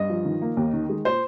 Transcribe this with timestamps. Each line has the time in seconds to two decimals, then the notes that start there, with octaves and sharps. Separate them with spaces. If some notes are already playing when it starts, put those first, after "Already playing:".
Already playing: G2 D#5
0.10 F3
0.25 D#3
0.42 A#3
0.57 D#2
0.73 D#3
0.89 G#3
1.05 A#2 C5